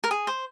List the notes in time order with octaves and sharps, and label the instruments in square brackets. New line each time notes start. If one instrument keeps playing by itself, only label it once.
[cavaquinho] A#4
G#4
C5